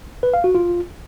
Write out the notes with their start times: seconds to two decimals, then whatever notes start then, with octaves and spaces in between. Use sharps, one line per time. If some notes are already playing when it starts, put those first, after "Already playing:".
0.23 B4
0.34 F5
0.44 F#4
0.55 F4